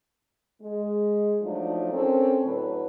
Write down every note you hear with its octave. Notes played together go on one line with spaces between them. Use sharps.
G#3
F3 F#3 A3 D4 D#4
C4 C#4 A4 A#4 C#5
A2 D3 F#3 B4